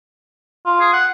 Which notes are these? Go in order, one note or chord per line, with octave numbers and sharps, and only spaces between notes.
F4
G#4
F#5